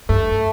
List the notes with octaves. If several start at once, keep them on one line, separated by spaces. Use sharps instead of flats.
G2 A3